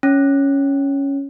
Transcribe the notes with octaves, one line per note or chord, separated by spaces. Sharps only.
C#4